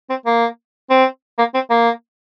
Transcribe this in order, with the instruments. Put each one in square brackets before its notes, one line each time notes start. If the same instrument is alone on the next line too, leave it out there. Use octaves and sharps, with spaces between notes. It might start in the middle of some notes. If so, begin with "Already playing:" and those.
[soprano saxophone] C4
A#3
C4
A#3
C4
A#3